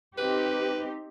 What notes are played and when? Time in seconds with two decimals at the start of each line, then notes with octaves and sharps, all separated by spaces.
0.18 C4 D#4 G4 B4